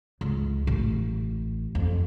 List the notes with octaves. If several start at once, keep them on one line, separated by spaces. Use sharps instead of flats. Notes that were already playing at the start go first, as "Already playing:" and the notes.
C#2
A1
F2